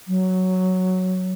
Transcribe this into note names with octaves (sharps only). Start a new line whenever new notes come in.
F#3